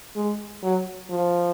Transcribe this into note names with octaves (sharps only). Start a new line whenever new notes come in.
G#3
F#3
F3